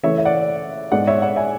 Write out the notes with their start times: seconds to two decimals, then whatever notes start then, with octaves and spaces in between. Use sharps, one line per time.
0.03 C#3 E3 A3 C#5 E5
0.18 E5
0.25 D5 F#5
0.92 G#2 G#3 B3 D5 F#5
1.07 C#5 E5
1.21 D5 F#5
1.36 E5 G#5